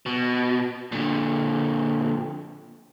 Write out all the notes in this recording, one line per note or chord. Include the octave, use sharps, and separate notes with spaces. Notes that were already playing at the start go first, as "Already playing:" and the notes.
B2
A#2 D3